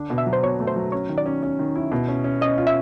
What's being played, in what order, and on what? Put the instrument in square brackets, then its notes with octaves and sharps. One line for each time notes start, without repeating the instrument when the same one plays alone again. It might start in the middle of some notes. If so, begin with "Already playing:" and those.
Already playing: [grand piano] D3 D4
B2
[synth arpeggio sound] E5
[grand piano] F#3
[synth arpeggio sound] C5
[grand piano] B2 [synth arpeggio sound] C#5
[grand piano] A3
[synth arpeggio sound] C5
[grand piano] F#3
[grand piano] C#4 [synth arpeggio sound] C#5
[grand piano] D#3
[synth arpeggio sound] D5
[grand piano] C#4
C#4
D#3
E4
B2
C#4
C#4
[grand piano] C#4 [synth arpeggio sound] D#5
[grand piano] F4
[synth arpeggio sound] E5